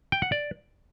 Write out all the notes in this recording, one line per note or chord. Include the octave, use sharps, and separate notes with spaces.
G5
F#5
D5